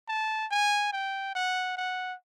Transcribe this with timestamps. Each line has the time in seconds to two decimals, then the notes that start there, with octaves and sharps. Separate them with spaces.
0.08 A5
0.51 G#5
0.93 G5
1.35 F#5
1.77 F#5